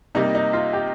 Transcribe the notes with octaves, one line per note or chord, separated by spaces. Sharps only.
C3 G3 A#3 D#4
D#4
F4
G4